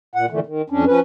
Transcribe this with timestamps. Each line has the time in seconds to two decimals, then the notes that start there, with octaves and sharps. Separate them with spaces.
0.15 A#2 F#5
0.30 F2 A#2 D3 E3 A3
0.46 D#3
0.70 F2 C#4 D4
0.87 F3 C#4 B4